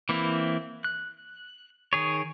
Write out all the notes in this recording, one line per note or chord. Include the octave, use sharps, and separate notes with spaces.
E3 A#3 C4 E4
F#6
D#3 G#4 C#5